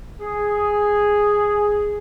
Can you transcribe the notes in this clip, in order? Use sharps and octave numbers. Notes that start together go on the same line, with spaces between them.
G#4